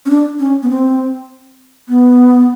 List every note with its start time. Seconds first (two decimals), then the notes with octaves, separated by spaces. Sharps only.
0.06 C#4
0.10 D4
0.39 C#4
0.63 B3
0.70 C4
1.89 B3